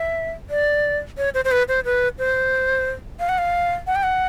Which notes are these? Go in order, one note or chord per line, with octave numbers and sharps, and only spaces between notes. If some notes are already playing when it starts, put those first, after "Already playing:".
Already playing: E5
D5
C#5
C5
C5
B4
C5
B4
C5
F5
F#5
F5
F#5
G5
F#5